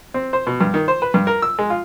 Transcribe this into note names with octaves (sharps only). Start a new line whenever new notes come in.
C4
C5
B2
G2
D#3
C5
B4
G2
A#4
E6
G#3
F4